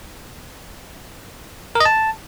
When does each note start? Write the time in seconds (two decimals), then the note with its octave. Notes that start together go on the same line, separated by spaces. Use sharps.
1.75 A#4
1.80 D#5
1.85 A5